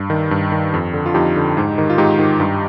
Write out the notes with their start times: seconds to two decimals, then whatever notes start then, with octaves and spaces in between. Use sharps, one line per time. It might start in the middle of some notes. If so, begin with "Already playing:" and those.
Already playing: G2
0.10 D#3
0.31 G2
0.52 D#3
0.74 F2
0.94 D3
1.06 F4
1.14 F2 D#4 G4
1.36 D3
1.57 G#2
1.78 D#3
1.90 F4
1.98 G#2 D#4 G4
2.19 D#3
2.40 G2